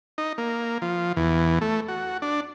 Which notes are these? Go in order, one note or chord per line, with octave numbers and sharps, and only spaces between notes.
D#4
A#3
F3
E2
A3
F#4
D4